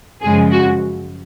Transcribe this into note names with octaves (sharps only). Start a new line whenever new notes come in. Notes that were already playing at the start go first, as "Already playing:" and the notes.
F#2 C#3 F3 G#3 G#4
F#4